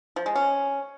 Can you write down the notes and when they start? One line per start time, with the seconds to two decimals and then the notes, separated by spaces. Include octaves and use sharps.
0.16 F3
0.26 G#3
0.36 C#4